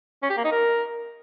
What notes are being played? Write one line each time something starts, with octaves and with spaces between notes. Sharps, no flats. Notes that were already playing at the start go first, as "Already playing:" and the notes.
C#4
G4
A#3
D#4
A#4